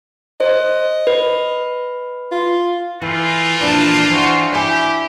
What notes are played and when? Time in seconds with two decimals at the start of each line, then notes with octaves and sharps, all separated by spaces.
0.40 C5 D#5
1.07 B4
2.32 F4
3.02 E3 A3 A#3 F4
3.60 A#2 E3 F3 D4 A5
4.10 E3 F#4 C5
4.53 E4 G4 C#5 G#5